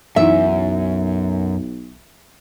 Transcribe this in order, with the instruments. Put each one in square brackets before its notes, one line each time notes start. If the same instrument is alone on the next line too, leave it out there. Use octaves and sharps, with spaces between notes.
[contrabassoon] B1 [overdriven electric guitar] F#2 [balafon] E3 D#4 E4 [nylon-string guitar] E5